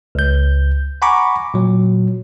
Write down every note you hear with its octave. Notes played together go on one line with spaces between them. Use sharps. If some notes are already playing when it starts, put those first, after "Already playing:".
C#2 G6
F#5 G#5 A#5 B5 C#6 D6
A#2 F#3